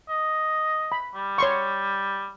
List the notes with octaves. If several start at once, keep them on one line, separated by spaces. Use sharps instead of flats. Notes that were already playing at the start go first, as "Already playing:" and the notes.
D#5
B5
G3
C#5 C6 C#6